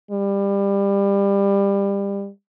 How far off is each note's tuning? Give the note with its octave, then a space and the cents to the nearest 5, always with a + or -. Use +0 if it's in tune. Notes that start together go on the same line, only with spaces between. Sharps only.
G3 +25